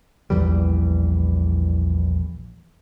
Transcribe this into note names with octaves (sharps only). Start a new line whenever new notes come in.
A#1 E2 E3 G3